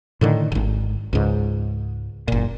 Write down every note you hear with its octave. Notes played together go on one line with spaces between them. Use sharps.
A2 D3 D#3
D#1 G#1
C#2 G#2
F#1 A#2